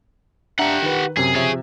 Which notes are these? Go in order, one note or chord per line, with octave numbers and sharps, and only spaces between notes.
D4 G4 E5 F#5 A#5
D#3 B4
F#2 C3 G#4
C3 F3 G#4 C#5 E5